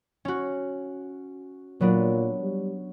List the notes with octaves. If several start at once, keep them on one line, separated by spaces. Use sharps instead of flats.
C#4 F#4
A#2 F#3 B3 D4
G3